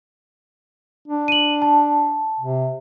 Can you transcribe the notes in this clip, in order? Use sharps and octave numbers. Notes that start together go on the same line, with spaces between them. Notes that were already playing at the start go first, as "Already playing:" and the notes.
D4
D#7 F#7
A5
C3